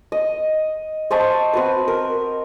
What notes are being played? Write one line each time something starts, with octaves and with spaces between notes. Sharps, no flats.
D#5
C5 D#5 A5 C#6
C4 F#4 B4
A#4